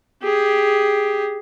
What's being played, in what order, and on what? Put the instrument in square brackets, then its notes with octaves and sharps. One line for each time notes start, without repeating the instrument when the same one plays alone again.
[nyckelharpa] G4 G#4